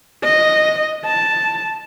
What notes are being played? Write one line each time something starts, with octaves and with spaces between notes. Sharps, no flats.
D#5
A5